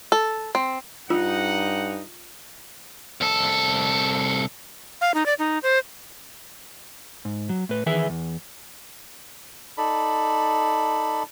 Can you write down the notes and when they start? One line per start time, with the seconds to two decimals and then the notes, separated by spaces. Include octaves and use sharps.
0.12 A4
0.55 C4
1.10 G2 D#4 F4 F#5
3.21 C2 A4
5.01 F5
5.14 D#4
5.26 D5
5.39 D#4
5.63 C5
7.25 G#2
7.49 F#3
7.69 A2 B4
7.86 D#3 E3 G#4 B4 E5
8.09 E2
9.78 D#4 A4 D5 B5